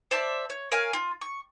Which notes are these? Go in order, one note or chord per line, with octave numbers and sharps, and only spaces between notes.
C5 D5 E5 A5
C#5
A#4 C#5 F5 G#5
F4
C#6